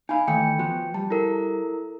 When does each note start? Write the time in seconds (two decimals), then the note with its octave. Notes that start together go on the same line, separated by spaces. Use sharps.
0.09 D#4 F5 G#5 B5
0.27 D#3 E3 A3 G5 C#7
0.59 F3 B3 F#4
0.94 G3 A5
1.10 E4 A4 A#4